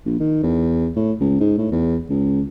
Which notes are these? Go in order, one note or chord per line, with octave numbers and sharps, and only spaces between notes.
A#1
D#3
E2
A2
C#2
G#2
A2
E2
C#2